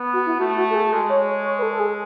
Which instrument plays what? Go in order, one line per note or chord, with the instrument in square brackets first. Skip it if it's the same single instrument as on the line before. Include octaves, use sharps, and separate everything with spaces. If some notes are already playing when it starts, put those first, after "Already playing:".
Already playing: [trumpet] B3
[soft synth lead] F#4
E4
[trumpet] A3 [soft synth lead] F#4
[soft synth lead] F#4
A4
G#4
G#4
[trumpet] G#3 [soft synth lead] A4
[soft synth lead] C#5
C#5
C#5
B4
A4
A4
G#4